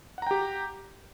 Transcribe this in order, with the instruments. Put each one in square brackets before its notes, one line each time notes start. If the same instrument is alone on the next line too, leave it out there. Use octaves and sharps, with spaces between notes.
[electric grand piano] F#5
A#5
G5
G4